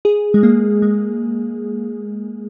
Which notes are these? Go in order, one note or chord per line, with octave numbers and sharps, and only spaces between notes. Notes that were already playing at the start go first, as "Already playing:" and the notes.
G#4
G#3
A#3
G#3